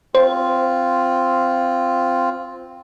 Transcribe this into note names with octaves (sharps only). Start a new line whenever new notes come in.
C4 F4 C5